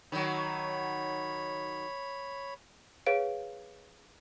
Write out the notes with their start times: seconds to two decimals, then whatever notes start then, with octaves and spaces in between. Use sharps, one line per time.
0.12 D#3 F#3 C#5 B5
3.06 G#4 B4 C#5 F5 D7